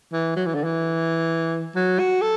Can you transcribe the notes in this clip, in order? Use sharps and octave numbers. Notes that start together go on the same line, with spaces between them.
E3
F#3
E3
D3
E3
F#3
F#4
A4